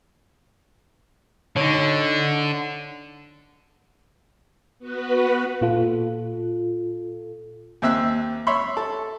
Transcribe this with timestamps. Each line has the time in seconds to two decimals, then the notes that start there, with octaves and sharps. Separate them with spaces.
1.56 D3 D#4 C#5
4.79 B3 F#4 B4
5.61 A#2 F4 A4
7.82 D#2 C4 E5 E6 F#6
8.47 C#5 E5 B5 C6
8.77 A4